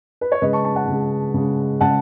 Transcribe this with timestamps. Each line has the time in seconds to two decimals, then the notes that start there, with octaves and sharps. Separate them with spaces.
0.21 B4
0.32 C#5
0.42 C#3 G#3 B4 D#5
0.53 A5 C#6
0.64 A5 C#6
0.76 F#5 A5
0.88 C#3 G#3
1.34 C#3 G#3
1.81 C#3 G#3 F#5 A5